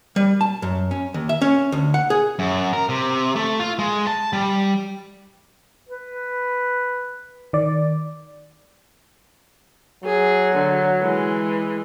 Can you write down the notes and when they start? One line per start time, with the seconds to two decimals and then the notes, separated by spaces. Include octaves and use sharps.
0.16 G3
0.41 A5
0.62 F#2
0.91 C#4
1.14 D#2
1.29 E5
1.42 C#4
1.72 D2
1.94 F#5
2.10 G#4
2.39 F#2
2.73 A#4
2.89 C3
3.36 A3
3.60 F4
3.79 G#3
4.07 A5
4.33 G3
5.89 B4
7.53 D#3 D5
10.04 F#3 G#4
10.55 D3
11.01 E3 G#3